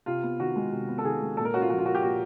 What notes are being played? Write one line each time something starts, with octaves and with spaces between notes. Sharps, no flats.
C3 F4
B3
D#3 F#4
G#3
C3
B3
A4
D#3 G#4
G#3
A#2 A4
A#4
C#4 F#4
F4
F3 F#4
F4
A#3 F#4
G4
A#2 F#4